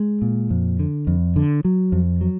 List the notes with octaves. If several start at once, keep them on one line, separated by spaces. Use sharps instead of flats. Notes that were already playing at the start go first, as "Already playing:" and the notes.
Already playing: G#3
A#2
F2
D3
F2
D3
F#3
F2
F#3